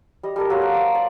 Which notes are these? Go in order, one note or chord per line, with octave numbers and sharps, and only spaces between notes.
G3 D#5
G3 A4 A#4
F#3 A#3 A#4 C5
D6
D6
D5